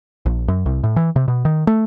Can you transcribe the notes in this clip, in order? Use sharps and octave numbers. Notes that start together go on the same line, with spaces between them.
A#1
F#2
C2
A2
E3
C3
B2
D#3
A3